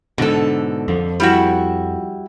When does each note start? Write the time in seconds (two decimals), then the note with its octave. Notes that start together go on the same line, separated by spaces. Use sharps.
0.18 G#2 B2 D3 A4
0.88 F2 F3
1.20 G3 E4 F#4